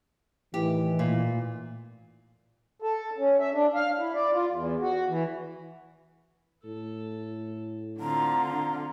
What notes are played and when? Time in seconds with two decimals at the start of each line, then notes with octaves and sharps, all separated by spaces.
0.54 A2 D#3 E3 G4
0.99 A#2
2.82 A4
3.18 C#4
3.39 E5
3.54 D4
3.75 F5
3.99 E4
4.15 D5
4.34 F4
4.51 E2
4.81 F#4
5.08 E3
6.65 A2 A4
8.00 D3 C4 F4 A#5